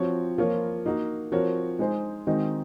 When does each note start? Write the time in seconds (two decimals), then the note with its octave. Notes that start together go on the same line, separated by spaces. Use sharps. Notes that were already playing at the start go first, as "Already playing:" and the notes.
Already playing: F3 C4 F#4 C#5
0.38 F3 A#3 F4 A#4 C#5
0.86 A#3 D#4 F#4
1.32 F3 C4 F#4 A#4 C#5
1.79 G#3 D#4 G#4 C5
2.27 D#3 G#3 C4 D#4 F#4